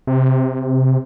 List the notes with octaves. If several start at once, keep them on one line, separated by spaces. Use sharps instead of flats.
C3